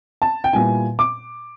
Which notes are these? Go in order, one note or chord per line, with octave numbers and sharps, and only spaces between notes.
A5
G5
A#2 G3 B3 E4 G#5
D6